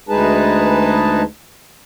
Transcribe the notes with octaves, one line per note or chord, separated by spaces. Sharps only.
D2 G#3 D#4 G#4 B4 A5